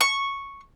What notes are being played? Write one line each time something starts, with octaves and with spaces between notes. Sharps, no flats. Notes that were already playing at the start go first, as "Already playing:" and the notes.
C#6